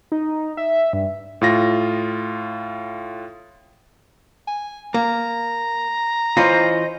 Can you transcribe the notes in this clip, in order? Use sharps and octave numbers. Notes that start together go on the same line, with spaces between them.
D#4
E5
G2
A2 F4 A#6
G#5
A#3 A#5
E3 C#4 F4 C5 D#5